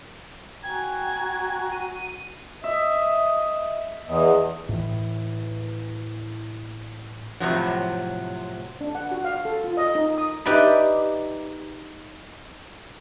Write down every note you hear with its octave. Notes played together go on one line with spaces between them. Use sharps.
F#4 G5 G#5 A#5 G#6
D#7
D#5 E5
E2 D#5
A2 E3
A2 C3 F3 F#3
D4
F#5
F#4
F5
A4
F4
D#5
D#4
D#6
D#4 G4 B4 D5 E5 B5